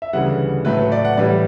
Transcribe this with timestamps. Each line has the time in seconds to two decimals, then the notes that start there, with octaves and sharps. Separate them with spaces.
0.02 E5
0.13 D2 C#3 E3 G3 F#5
0.65 A2 F#3 A3 B4
0.78 B4
0.92 D5
1.05 F#5
1.17 A2 E3 G3 D5